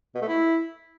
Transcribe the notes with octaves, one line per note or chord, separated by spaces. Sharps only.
B2
A3
E4